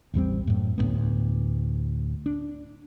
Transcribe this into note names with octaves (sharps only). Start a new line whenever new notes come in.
A1 E2 G3 C4
F#2 A2
D2 A2 A#3 B3
D4